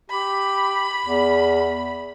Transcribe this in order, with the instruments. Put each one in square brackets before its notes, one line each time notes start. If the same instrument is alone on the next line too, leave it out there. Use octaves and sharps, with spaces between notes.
[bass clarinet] G4 [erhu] B5
[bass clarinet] E2